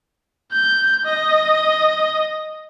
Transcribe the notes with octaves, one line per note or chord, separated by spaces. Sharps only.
G6
D#5